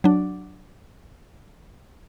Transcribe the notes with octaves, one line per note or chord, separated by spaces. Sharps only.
F#3 D4